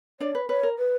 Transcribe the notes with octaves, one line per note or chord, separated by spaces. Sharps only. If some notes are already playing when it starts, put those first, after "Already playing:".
D4 C#5 D5
B4
B4 C#5
A#4
B4